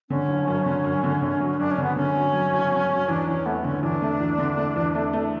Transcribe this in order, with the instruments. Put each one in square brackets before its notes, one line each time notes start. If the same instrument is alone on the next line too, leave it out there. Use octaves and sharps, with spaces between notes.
[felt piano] D3 [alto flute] C#4
[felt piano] F#1
F#2
D3
F#2
D3
D3
F#3
[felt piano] F#2 [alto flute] D4
[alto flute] C#4
[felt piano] D3
[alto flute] B3
[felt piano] D3 [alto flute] C#4
[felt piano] F#3
F#3
F#1
F#3
F#3
[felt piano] E2 [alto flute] D4
[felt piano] E2 [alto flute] C#4
[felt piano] A3 [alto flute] B3
[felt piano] D3 [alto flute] C#4
[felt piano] E2 [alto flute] D4
[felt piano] A3
E2
D3
A3
E2
A3
A3